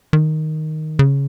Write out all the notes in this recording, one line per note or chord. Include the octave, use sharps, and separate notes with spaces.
D#3
C#3